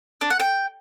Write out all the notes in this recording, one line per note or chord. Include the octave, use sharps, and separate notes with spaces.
D4
F#5
G5